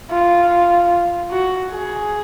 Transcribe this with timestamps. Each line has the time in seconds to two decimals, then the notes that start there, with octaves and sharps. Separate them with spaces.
0.11 F4
1.31 F#4
1.71 G#4